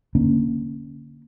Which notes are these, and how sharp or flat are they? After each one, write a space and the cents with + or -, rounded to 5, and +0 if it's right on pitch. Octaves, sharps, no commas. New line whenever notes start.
D3 +0 A#3 +0 C#4 +0